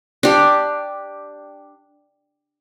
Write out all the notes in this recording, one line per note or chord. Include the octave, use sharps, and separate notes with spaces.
D4 G4